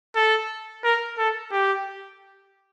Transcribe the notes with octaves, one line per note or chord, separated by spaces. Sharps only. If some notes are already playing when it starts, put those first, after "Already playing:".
A4
A#4
A4
G4